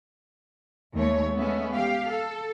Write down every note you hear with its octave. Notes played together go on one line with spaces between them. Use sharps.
D#2 G#3 A3 C#5
G#3 A3 B3 C#4 E5
G4 F5
A4